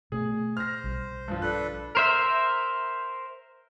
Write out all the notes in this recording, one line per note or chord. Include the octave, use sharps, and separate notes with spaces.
B2 A3 B3 G#4
C5 F6 A#6
B1 G3
G2 F3
D4 A4 B4 F#6
A#4 C5 E5